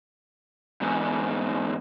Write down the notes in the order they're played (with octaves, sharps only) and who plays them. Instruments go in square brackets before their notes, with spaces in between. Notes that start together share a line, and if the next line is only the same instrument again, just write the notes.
[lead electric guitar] E2 G#2